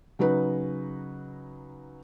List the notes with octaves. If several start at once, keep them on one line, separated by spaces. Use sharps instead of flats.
C#3 F#3 D#4 B4